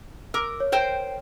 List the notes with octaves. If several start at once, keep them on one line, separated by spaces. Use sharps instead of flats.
A#4 D6 E6
C#5
A#4 C5 G5